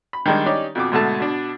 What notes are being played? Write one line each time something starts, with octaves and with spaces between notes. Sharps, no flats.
B5
D#3 G3 G#3 D4
C#4 D#4 G4 D5
F2 B2 D6
G#2 B2 D3 A3 A5
B2 D4